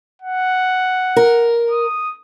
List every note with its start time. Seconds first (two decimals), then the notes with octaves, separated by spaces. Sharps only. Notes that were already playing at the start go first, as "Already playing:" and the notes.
0.22 F#5
1.16 A#4
1.71 D#6